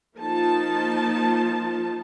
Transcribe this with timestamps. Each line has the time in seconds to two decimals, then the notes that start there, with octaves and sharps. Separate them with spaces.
0.17 F3 A#3 D#4 F4 A5